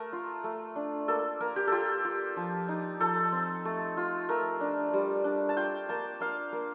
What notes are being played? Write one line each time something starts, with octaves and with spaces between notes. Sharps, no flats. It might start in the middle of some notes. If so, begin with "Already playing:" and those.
Already playing: A3 A#4
F4
A3
D4
A#3 A4
A#3 A#4
G4
F4 G4 A4
F4
F3
D#4
F3 A4
C4
A3
F4
A3 A#4
D4
G3
D4
A5
F4 G5
A#3 A5
A#3 F5
A#3